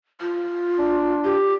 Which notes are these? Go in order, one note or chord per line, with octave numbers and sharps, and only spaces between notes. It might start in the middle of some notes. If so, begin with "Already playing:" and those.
F4
D4
G4